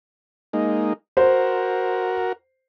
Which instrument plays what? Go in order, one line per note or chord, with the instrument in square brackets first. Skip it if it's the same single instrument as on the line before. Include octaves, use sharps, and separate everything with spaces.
[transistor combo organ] G#3 A#3 D#4
[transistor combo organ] F#4 A#4 [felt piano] C5